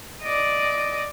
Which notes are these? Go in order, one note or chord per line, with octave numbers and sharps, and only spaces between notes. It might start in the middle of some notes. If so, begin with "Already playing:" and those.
D5 D#5